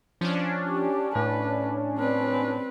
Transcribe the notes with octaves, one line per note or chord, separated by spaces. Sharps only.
F3 C#4 D4
G4
A2 B4
C4 B4